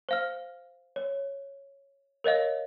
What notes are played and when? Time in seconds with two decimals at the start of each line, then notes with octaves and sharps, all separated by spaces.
0.09 C5 F5 F6
0.96 C#5
2.24 A#4 C#5 D#5 F5